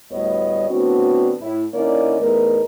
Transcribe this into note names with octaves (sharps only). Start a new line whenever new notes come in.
D2 A2 G3 B3 C#5 D#5
A2 D3 B3 C4 D4 F#4
A2 E4
D3 A#3 C#4 D#4 E4 D5
E2 A3 B3 D#4 A#4 B4